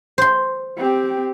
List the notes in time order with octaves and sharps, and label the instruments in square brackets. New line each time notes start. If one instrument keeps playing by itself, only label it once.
[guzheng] C5 C6
[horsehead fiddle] C4 G4